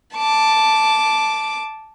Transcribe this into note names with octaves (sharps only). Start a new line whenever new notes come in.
A5 D6